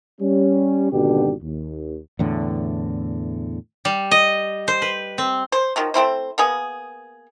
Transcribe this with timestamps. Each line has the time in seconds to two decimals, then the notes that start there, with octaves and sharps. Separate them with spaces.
0.21 G3 C#4
0.93 G#1 B2 D3 D4 G4
1.43 D#2
2.19 E2 A2 D3
3.85 G3
4.11 D#5
4.68 C5
4.82 B4
5.18 C4
5.52 C5
5.76 D#3 F3 F#3
5.94 A3 C4 E4 C5
6.38 A#3 B3 G#4